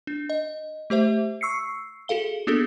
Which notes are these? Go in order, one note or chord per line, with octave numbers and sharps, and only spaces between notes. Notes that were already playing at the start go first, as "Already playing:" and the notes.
D4
D#5
A3 G4 C5 E5
C#6 E6 C7 C#7
F#4 G#4 A4 F5 G7
A#3 B3 D4 F#4 G#4 A4